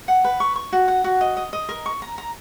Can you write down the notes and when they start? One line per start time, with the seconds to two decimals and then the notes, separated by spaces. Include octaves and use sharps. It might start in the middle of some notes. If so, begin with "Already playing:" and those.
0.08 F#5
0.24 B4
0.40 C#6
0.56 C#6
0.73 F#4
0.88 F#5
1.04 F#4
1.21 D#5
1.37 D#5
1.53 D#5
1.69 A#4
1.86 C#6
2.02 A#5
2.18 A#5